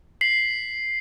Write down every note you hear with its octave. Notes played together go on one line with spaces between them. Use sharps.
B6 C7 F#7